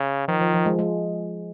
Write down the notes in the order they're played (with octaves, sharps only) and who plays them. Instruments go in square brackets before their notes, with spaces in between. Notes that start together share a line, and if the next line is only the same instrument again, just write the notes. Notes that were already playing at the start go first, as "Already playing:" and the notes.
Already playing: [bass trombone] C#3
[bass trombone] D#3 [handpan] F3
[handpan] F3
F3
G#3
G#3